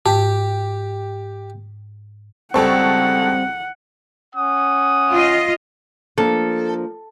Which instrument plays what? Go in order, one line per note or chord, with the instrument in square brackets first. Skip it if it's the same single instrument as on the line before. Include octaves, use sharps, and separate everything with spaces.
[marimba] G#2 [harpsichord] G4
[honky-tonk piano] C#2 A4 C#6 [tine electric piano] G3 C4 [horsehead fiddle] F#5
[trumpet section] C#4 F#5 D#6
[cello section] F4 D#5
[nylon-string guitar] F3 A#3 D4 [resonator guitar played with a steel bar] A4